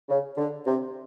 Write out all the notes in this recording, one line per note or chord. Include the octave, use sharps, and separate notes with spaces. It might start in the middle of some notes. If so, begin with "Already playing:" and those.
C#3
D3
C3